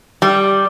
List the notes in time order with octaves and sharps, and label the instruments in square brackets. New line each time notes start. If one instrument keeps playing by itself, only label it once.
[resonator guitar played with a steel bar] G3